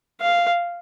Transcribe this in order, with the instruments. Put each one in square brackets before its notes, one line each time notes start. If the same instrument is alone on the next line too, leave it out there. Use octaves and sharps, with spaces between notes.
[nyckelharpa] F5